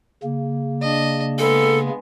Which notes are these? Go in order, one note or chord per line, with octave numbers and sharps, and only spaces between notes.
C#3 A#3
D4 D#5
G#3 B3 A4